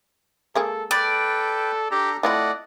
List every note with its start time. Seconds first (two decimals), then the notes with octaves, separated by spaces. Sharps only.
0.55 G#3 A#3 G#4 A4
0.91 A4 B4 D5 G5
1.91 D4 G4 A4 A#5
2.23 A3 C4 E4 F4 D5 D#5 F#5